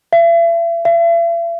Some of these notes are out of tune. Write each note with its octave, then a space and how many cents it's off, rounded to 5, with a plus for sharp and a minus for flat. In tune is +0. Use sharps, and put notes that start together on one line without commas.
E5 +40
E5 +45